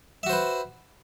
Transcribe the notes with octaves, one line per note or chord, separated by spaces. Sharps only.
F#4 B4 C5 E5